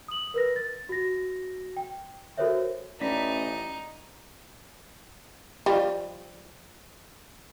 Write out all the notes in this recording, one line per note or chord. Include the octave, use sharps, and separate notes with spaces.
D#6 F#7
A#4 B4 A#6
A6
F#4 A#6
G5
F#4 A4 A#4 C5 C#5 E5
A1 D#4 D5 A#6 B6
F3 G3 F4